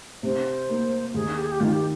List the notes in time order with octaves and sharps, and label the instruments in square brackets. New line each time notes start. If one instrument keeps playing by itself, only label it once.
[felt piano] C3 [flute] C5
[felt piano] A#3
[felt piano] D#2 [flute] G#4
[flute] G4
G#4
G4
[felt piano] D#3 [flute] F4
[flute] G4